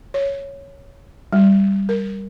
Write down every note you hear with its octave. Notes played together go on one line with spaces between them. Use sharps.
C#5
G3
A#4